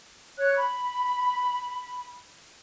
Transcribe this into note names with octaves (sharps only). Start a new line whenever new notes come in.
C#5 F#6
B5